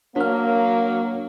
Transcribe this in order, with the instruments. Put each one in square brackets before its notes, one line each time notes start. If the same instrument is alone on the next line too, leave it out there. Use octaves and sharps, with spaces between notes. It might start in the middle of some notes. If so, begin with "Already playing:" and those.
[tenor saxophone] F#3 [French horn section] A#3 [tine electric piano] D4 F6